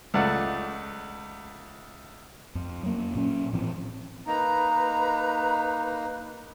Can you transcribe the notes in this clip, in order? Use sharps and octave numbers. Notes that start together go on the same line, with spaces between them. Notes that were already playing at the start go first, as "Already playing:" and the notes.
C#2 A3 D5 F#5
F2
F#3 A#3
A#2 C#4
A2 E3 F3 C4
A#3 D#4 B4 A#5